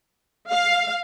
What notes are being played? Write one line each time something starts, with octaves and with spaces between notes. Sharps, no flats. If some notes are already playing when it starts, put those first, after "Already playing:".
F5